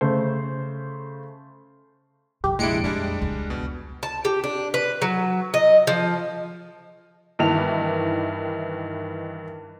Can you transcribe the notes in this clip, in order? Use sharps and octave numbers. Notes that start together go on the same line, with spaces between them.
C#3 A3 C5
F2 C3 G4
A#1 G#3 D4 E4 C#7 D7
F2 G3 G#3 D4
C#2
B2
A5
G4
D4
B4
F#3
D#5
F3
G2 D#3 E3 F7